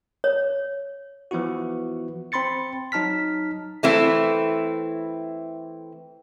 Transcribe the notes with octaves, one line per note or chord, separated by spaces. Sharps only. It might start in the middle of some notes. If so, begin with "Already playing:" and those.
C#5
E3 F3 B3 E4 F#4
C4 B5 C6 A6 C#7
F#3 D#4 A5 F6 B6
E3 A3 C4 E4